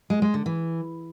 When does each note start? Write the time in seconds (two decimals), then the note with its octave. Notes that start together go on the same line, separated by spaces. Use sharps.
0.10 G#3
0.22 G#3
0.34 D3
0.46 E3